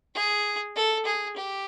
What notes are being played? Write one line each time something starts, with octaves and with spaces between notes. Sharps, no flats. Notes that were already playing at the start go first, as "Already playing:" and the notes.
G#4
A4
G#4
G4